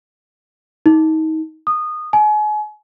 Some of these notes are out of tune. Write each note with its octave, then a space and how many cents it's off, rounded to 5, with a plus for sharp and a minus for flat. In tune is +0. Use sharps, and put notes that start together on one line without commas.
D#4 +30
D#6 -20
G#5 +35